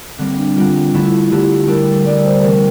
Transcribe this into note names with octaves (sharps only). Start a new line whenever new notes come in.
D3 G3 A#3 C4
D4
D3 G3 A#3 F4
D3 A3 E4
D3 A3 E4 G4
G3 D4 A4 A#4
G3 D4 A4 D5
C5
C3 E3 A3 C4 A#4